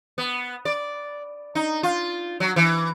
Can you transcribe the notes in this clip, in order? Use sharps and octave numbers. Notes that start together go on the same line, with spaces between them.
B3
D5
D#4
F4
F#3
E3